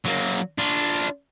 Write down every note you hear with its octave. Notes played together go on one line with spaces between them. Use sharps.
F#3 A#3
D4 F4